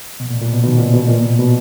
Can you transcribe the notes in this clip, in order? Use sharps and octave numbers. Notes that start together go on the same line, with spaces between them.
B2
A#2
A#2
B2
B2 D#3
A#2 C#3
B2
A#2
B2
B2